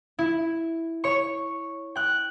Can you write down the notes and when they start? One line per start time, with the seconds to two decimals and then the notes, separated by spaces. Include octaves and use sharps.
0.19 E4
1.04 C#5 C#6
1.95 G5 F#6